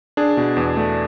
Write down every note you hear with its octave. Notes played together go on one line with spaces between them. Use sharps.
D4 G#4
B2
E2
A3